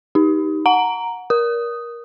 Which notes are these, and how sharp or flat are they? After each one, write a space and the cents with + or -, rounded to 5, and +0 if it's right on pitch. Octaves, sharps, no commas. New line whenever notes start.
D#4 +5 G4 +0
F#5 -15 A#5 +0
A#4 +20 D#6 +0